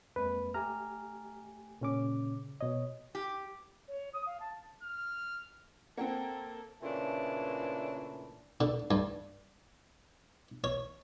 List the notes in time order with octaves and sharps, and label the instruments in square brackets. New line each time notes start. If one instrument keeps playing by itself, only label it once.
[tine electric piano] F2 G#3 A#3 [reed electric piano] B4
[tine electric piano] A3 G4 G#5 [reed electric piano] A#5 F6
[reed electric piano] A#2 C#4 D6 [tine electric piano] C#3
[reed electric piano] B2 D#5 [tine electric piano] C#5
[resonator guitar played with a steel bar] G4
[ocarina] C#5
D#6
F5
A5
[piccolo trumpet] F6
[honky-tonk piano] A#3 C4 [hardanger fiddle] A4 [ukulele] F#5 G5
[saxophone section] A#2 C#3 E3 A3 D4
[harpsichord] D3
G2
C#5